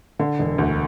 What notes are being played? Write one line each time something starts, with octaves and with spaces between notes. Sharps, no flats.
D3
E1
D2